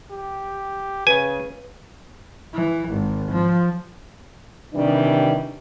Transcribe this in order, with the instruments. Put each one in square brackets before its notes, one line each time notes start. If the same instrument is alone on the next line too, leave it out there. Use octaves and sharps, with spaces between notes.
[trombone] G4
[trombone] C#3 [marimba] B4 [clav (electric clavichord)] G#5
[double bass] E3
G#1
F3
[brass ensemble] C3 D#3 E3 G3 D4